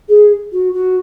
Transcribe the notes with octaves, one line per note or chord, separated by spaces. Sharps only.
G#4
F#4
F#4